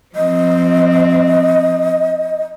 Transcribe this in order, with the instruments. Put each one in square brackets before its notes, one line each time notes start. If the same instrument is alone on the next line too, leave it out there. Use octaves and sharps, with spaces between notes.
[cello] F3 C4 [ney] D#5